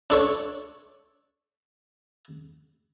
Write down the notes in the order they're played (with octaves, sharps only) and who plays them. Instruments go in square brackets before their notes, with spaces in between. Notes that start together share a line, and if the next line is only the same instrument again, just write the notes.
[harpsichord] D4 A4 C#5